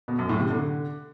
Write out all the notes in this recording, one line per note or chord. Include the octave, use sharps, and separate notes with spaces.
B2
F#2
A2
C3
D3